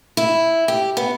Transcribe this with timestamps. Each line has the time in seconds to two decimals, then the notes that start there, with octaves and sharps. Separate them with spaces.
0.17 E4
0.68 G4
0.97 B3